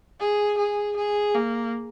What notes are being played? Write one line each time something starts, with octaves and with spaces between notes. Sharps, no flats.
G#4
G#4
G#4
A#3